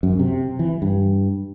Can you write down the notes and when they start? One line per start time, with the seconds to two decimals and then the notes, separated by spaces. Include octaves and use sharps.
0.03 F#2
0.19 C3
0.59 E3
0.82 G2